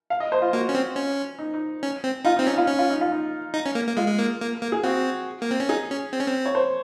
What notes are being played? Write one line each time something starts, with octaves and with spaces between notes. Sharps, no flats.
F5
D#5
C5
F4
A#3 F#4
C#4
C4
C#4
D#4
D#4
C#4
C4
D#4 F4
C4 D#4
C#4 D#4
F4
C#4
F4
D#4
F4
D#4
D#4
C#4
A#3
A#3
G#3 F4
G#3
A#3
A#3
A#3
G#4
C4 F#4
A#3
C4
C#4
D#4 G#4
C#4
C4
C#4
C4
C#5
C5